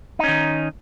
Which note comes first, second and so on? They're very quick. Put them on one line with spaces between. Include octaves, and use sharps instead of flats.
D#4 C#4 D#3